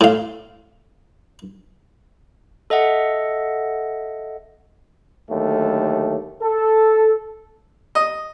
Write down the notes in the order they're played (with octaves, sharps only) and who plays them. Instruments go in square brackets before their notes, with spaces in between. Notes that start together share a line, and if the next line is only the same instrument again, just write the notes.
[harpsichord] A2 F5
[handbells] A4 D#5 E5 F#5
[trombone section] D#2 D3 F#3 A3
A4
[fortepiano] D#5